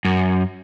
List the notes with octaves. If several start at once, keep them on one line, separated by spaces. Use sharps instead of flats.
F#2